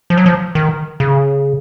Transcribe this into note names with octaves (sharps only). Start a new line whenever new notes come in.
F3
F#3
F3
D#3
C#3